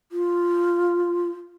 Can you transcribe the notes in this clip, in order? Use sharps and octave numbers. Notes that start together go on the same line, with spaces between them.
F4